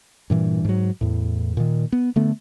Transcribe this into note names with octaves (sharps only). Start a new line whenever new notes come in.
G2 A#2 E3
G#2 F#3
E2 A2
A#2 D#3
B3
D3 A3 B3